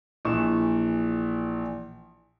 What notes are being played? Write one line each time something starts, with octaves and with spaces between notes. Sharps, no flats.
A#1 E3 C#6 E7